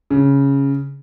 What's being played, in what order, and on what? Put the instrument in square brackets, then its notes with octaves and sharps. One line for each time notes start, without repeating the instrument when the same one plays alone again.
[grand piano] C#3